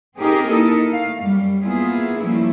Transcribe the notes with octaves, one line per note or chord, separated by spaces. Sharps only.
C4 C#4 D#4 G4 G#4 A#4
A#3 D#4 E4 A4 A#4 D#5
A3 F5
F#2 G3
A#3 B3 E4 F4 G#4
F3 G3 A3 A#3 C#4 E4